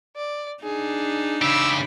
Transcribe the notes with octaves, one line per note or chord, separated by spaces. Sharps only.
D5
D4 D#4 G#4
C#3 G4 B5 E6